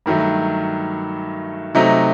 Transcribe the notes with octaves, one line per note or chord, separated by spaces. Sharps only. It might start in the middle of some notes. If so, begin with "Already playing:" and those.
G2 D#3 F#3 A3
C3 F#3 A3 D#4